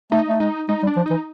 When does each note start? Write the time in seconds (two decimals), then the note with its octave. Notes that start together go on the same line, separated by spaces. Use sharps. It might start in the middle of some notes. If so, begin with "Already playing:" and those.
0.12 A3 D#4
0.28 A3
0.40 G#3 D#4
0.69 G#3 D#4
0.83 G3
0.87 D4
0.97 F3
1.06 E3 D#4